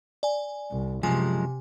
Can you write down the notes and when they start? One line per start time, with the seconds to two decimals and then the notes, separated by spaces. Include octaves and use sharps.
0.23 D5 G#5
0.71 C2
1.03 F#2 C3 F3 G#3 G#5